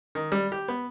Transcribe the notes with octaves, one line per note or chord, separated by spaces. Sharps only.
D#3
G3
G4
B3